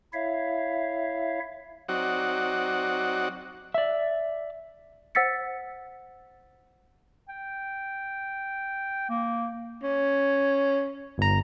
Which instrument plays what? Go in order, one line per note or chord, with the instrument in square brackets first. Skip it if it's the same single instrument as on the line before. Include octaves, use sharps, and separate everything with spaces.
[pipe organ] E4 C#5 E5 F5
[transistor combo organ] F#3 C4 D#4 F#4 D5 F#5
[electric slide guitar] D5 E5
[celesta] C5 F#5 E6 A6 B6 C#7
[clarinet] G5
A#3
[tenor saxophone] C#4
[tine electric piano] G1 A#5